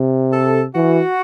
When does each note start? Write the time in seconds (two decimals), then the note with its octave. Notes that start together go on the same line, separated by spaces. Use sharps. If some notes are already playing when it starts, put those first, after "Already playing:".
Already playing: C3
0.32 A4
0.75 E3 F#4